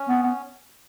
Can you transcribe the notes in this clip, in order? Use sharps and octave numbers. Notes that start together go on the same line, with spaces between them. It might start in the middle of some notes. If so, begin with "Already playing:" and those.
Already playing: C#4
B3
B3